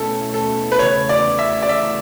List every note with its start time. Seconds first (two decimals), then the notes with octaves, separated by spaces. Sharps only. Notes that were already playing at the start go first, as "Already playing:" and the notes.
Already playing: B2 A3 C#4 E4 A4
0.34 A4
0.72 B4
0.79 E2 C#3 E3 A3 E4 C#5
1.09 D5
1.39 E5
1.62 D5
1.69 E5